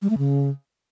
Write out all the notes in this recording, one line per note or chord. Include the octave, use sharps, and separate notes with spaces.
G3
A3
C#3